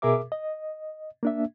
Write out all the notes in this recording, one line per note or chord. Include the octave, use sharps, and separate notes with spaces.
B2 G#4 A#4 E5 D6
D#5
A#3 D4 E5